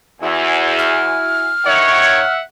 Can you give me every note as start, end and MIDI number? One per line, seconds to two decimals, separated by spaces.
0.21 1.17 40
0.21 1.52 64
0.21 1.52 66
0.21 1.52 80
0.79 2.33 89
1.65 2.19 51
1.65 2.19 73
1.65 2.40 76
1.65 2.40 78